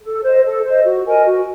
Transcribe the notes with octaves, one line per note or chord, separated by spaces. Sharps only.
A4
C5 D#5
A4
C5 D#5
F#4
A#4 D#5 G#5
F#4